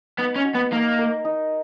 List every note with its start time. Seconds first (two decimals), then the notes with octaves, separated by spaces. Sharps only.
0.18 B3 D#4
0.36 C#4
0.45 F#4
0.54 B3
0.72 A#3 D#4
0.99 A#4
1.25 D#4